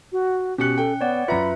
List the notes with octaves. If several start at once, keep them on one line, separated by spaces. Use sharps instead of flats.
F#4
B2 C#4 G4 F#6 C#7
A4 G5
B3 C#5 D5 F#5
F#2 F4 B4 E5 A#5 B5 C#7